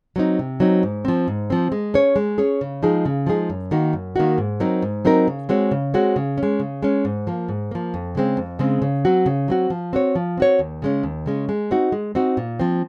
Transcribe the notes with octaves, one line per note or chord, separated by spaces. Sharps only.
F#3 C4 D#4
C3
F#3 C4 D#4
G#2
F3 C4
G#2
F3 C4
G#3
C#4 G#4 C#5
G#3
C#4 G#4 C#5
C#3
F3 G#3 D#4 G#4
C#3
F3 G#3 D#4 G#4
F#2
D#3 A#3 D#4 F#4
F#2
D#3 A#3 D#4 F#4
G#2
F#3 C4 D#4 A#4
G#2
F#3 C4 D#4 A#4
C#3
G#3 C4 F#4 C#5
C#3
G#3 C4 F#4 C#5
C#3
C#4
G#3
C#3
G#3 C#4
G#2
F3 A#3
G#2
F3 A#3
F2
C#3 G#3 C4
F2
C#3 G#3 C4
C#3
F#3 C4 F#4
C#3
F#3 C4 F#4
F3
C4 F#4 C#5
F3
C4 F#4 C#5
D#2
C#3 G#3 C#4
D#2
C#3 G#3 C#4
G#3
C4 D#4 F#4
G#3
C4 D#4 F#4
A#2
F3 C4